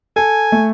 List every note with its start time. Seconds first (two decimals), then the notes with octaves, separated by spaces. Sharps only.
0.16 A4 G#5
0.52 A3